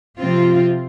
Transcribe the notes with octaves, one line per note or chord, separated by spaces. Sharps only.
C3 F3 C4 F4